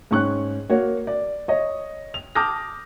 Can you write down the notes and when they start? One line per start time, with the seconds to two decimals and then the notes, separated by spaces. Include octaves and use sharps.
0.11 G#2 C#4 C#6 F#6
0.70 A#3 F#4 C#5
1.07 D5
1.48 C#5 D#5
2.14 F7
2.35 A5 D6 D#6 F6 G6 A#6